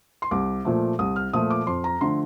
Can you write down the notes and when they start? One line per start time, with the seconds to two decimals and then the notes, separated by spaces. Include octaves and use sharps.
0.22 C6
0.31 C2 D6
0.65 A#2 F3 A3
0.99 C2 D#6
1.16 F6
1.33 A#2 F3 A3 D#6
1.50 D6
1.67 F2 C6
1.84 A#5
2.01 D3 F3 A3 C6